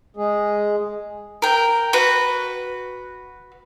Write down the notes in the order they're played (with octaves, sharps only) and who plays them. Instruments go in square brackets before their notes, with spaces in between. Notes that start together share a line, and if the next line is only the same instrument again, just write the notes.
[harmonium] G#3 G#4
[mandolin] A#4 G5
F#4 B4